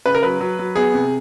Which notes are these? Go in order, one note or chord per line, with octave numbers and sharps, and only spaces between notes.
C#3 B4
A#4
F#3 B4
F#3
F#3
B3 G#4
C3